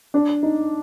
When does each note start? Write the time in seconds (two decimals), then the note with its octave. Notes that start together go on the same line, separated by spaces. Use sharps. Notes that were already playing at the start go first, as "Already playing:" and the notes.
0.14 D4
0.43 D#4